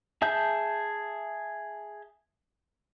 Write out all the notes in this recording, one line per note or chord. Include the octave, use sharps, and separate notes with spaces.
G#4 E5 A5 G6